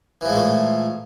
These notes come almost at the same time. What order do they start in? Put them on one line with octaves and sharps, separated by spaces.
E3 F3 G#3 A#2 A3